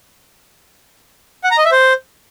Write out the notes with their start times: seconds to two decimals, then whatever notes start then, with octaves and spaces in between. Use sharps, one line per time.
1.44 F#5
1.51 A#5
1.58 D#5
1.65 E5
1.72 C5